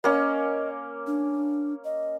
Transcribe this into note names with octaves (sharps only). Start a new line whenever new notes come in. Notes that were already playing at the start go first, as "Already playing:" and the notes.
A#3 C#4 D#5
D4
D#5